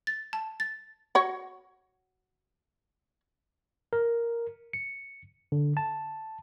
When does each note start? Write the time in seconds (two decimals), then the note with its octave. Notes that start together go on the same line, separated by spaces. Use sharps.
0.07 A6
0.33 A5
0.60 A6
1.15 F#4 C#5
3.93 A#4
4.73 C#7
5.52 D3
5.77 A5